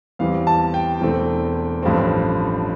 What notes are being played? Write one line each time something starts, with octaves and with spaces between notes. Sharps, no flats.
E2 E3 G3 C4 F5
A5
G5
E1 E2 E3 A3 C4
A1 G2 F3 A3 C4